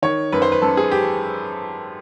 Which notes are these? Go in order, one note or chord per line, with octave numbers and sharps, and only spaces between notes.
D#3 C#5
F#2 B4
C5
B4
F#2 A4
G#4
G4